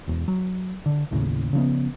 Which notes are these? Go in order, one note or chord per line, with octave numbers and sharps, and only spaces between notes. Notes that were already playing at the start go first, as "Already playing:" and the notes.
E1 E2
F#3
D3
A1 D#2 A2 C#3
C#3 F3 B3